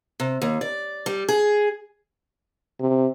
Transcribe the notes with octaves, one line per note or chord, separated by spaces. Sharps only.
C3
D#2
D5
G3
G#4
C3